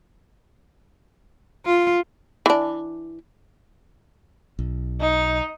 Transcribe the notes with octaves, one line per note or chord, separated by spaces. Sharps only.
F4
E3 D4
B1
D#4